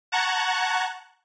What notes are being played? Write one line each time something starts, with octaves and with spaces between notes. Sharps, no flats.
F#5 A5 A#5 C#6 F#6 G#6